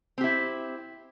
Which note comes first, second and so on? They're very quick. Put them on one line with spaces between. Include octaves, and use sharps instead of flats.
C4 G4 E4